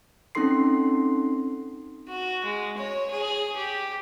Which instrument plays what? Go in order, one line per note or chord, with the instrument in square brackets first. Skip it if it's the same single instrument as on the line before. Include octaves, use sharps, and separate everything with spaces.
[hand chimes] C4 C#4 D#4 A4 C6 C7
[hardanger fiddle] F#4
G#3
C#5
G#4
G4